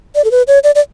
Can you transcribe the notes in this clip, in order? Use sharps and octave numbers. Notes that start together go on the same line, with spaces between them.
D5
A4
B4
C#5
D5
D5